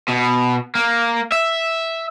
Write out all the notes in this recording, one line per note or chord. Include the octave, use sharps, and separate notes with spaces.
B2
A#3
E5